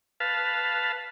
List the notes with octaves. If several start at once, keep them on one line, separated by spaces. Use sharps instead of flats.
B4 F5 A5